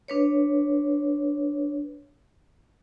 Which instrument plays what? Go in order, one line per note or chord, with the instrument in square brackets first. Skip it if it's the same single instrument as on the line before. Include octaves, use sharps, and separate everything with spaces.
[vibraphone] D4 B4 C#5